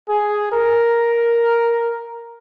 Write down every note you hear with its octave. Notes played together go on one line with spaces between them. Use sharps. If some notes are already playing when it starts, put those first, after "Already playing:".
G#4
A#4